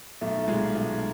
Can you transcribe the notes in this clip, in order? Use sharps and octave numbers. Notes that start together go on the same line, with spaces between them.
B1 A3
A#2 G#3
B1